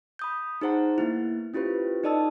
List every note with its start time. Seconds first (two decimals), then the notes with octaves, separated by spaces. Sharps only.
0.19 B5 D#6 G6
0.61 D#4 G#4 C5 F#5 A#5
0.98 A#3 B3 E4
1.54 C#4 E4 F4 G4 B4 C5
2.04 D#4 A4 D5 D#5 A5 E6